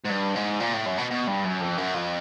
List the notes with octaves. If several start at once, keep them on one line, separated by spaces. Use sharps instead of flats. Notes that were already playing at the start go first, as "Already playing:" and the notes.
G#2
G2
G#2
A#2
A2
F#2
B2
B2
G2
F#2
F2
F#2
F2